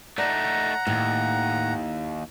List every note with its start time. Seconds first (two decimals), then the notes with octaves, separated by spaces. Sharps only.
0.18 A3 D#4 D5 F#5 A#5
0.87 D#2 A2